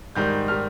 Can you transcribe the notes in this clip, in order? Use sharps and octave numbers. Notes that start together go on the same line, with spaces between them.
G#2 D#3 G3 G6
D#3 G3 F6